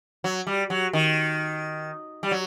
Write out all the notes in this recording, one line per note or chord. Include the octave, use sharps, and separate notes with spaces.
F#3
G3
F#3
D#3
G3
F#3